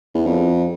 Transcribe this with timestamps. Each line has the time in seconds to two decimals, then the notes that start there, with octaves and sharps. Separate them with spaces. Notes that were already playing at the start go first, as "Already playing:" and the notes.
0.15 E2
0.26 F2